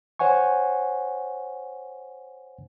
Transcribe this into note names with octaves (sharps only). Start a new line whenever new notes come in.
C5 C#5 F#5 G#5 C#6